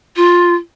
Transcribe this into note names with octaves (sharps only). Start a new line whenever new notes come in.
F4